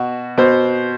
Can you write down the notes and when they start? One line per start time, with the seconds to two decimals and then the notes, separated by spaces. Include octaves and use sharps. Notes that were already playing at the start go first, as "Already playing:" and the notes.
Already playing: B2 F#4
0.38 B2 C5